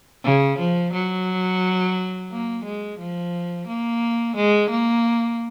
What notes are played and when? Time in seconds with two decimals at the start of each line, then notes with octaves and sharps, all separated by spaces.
0.24 C#3
0.59 F3
0.93 F#3
2.31 A#3
2.65 G#3
2.99 F3
3.68 A#3
4.36 G#3
4.70 A#3